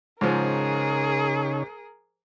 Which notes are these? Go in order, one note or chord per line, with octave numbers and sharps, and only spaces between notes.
G#2 C#3 F3 D#4 G#4 A#4 C#5